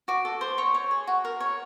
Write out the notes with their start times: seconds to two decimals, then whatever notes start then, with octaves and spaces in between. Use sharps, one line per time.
0.08 F#4 D6
0.25 A4
0.41 C5
0.58 C#5 C#6
0.75 C#5
0.91 G#4
1.07 F#4
1.25 A#4
1.40 C#5